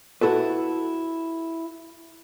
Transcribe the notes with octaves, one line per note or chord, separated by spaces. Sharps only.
E4 F#4 A4 B4